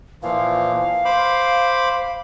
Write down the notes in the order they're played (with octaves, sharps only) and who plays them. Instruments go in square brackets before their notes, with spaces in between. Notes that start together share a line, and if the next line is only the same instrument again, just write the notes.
[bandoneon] A#2 E3 F3 [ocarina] F5
[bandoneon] C5 B5 D6